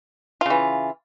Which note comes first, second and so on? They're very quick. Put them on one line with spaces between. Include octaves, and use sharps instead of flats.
F4 C#3 E3